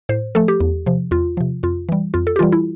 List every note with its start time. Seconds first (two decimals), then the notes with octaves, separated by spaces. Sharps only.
0.09 A2 C5
0.35 F3 A3 A4
0.48 G4
0.60 E2
0.86 C3 F3
1.11 E2 F4
1.37 C3 F3
1.63 F2 F4
1.89 E3 G3
2.14 F2 F4
2.27 A4
2.36 G4
2.39 E3 G3 F4
2.52 E4